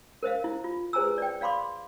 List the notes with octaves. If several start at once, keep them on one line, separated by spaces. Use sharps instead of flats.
A#4 C5 D#5 F5
E4
F4
G#4 B4 C5 G#5 A#5 E6
D5 G5
D5 F5 B5 C6 D6